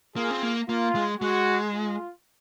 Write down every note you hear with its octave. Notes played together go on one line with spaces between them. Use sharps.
A#3 F4 G#4
C4
A#3
A#3 F4
G#3
G#3 F#4
F4